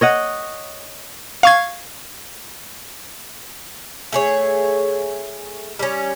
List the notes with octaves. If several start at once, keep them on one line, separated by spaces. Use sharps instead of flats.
C#5 D#5 F#5
F5 C#6 G#6
A3 G#4 C#5
G3 C#4